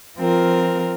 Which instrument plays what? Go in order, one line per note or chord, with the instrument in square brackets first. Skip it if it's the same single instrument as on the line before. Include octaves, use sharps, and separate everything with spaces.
[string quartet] F3 C4 F4 A#4